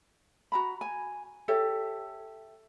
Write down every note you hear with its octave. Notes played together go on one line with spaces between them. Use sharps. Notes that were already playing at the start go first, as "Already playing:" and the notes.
F#4 A#5 B5
G#5
G4 A4 C#5 E5